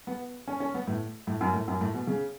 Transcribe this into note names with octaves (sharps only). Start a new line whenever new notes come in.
B3
C#4
C#4
B3
A2
A2
F#2
A2
F#2
A2
B2
C#3